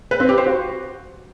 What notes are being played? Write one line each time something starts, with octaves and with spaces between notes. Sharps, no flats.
B4
C4
G4
C5
F#4